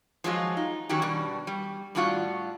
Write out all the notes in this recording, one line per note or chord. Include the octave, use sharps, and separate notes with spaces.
F3 F#3 G#3 F4
D#4
D#3 F#3 C#4 F#4 G4
B2 G3 D4
G3
A2 G3 D4 F4 F#4 F#5